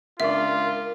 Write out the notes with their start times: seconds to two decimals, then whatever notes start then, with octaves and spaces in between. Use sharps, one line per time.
0.20 C#2 D4 F4 A#4 D5 E5